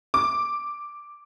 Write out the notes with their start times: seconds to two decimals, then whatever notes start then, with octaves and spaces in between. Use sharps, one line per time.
0.14 D6